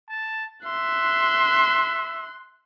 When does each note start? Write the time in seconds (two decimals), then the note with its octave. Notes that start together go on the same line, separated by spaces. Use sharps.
0.10 A5
0.65 E5 C6 F#6